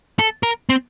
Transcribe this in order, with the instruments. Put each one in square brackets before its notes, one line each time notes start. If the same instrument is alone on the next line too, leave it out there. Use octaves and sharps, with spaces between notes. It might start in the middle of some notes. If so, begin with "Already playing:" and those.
[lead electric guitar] A4
A#4
C4